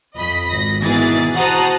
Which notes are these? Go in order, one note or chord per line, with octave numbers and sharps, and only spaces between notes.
F2 D#5 B5 B6
G#1 A#6
B2 D#3 E3 G#4 A6
F#4 C5 F#5 A5 A#5 D#6